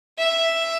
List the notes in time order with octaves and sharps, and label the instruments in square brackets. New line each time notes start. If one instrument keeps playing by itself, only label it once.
[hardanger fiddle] E5